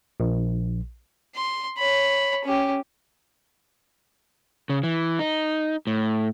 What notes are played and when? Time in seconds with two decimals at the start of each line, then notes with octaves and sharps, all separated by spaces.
0.20 A#1
1.35 C6
1.78 C#5 B5
2.45 C#4 G4
4.69 C#3
4.83 E3
5.19 D#4
5.87 A2